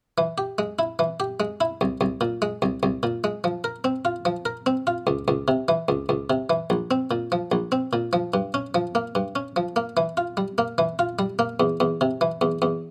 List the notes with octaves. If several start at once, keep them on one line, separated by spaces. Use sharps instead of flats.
E3
G4
G#3
E4
E3
G4
G#3
E4
C2
C2
A#2
G#3
C2
C2
A#2
G#3
F3
A#4
C4
F4
F3
A#4
C4
F4
C#2
C#2
C3
E3
C#2
C#2
C3
E3
A#1
C4
A#2
F3
A#1
C4
A#2
F3
G2
C#4
F3
A#3
G2
C#4
F3
A#3
E3
F4
G3
A#3
E3
F4
G3
A#3
E2
E2
C3
E3
E2
E2